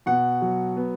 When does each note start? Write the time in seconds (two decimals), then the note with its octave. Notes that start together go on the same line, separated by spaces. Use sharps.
0.06 B2 F#5
0.42 F#3
0.76 B3